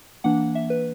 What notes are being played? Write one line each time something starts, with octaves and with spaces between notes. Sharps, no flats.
E3 A#3 D4 F#5
E5
B4